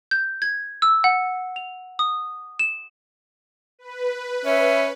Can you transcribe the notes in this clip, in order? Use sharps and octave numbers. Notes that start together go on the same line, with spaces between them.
G6
G#6
E6
F#5
F7
D#6
E7
B4
C#4 E5